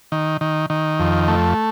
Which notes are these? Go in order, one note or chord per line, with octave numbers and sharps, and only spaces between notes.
D#3
D#3
D#3
F2
A3